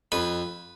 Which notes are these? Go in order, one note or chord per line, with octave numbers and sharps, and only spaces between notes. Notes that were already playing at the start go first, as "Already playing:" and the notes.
F2 B4